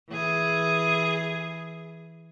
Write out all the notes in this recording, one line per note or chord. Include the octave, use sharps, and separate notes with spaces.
E3 G#4